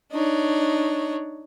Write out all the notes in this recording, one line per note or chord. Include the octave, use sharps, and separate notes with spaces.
D4 D#4 C#5